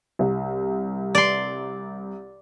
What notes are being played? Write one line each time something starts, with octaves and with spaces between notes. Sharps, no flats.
C2
D5 C6